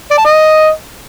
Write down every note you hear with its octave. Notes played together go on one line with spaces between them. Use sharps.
D5
A5
D#5